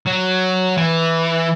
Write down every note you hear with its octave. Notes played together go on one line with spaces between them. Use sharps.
F#3
E3